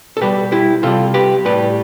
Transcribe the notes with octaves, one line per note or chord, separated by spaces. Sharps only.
A4
B2 G3 G4 B4
E4 G4
C3 G3 F4 A4
G4 B4
A2 G3 G4 B4